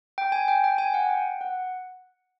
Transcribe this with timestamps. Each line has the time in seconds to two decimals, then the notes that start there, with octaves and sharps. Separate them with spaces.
0.18 G5
0.32 G#5
0.48 G5
0.64 G5
0.78 G#5
0.94 F#5
1.09 G5
1.41 F#5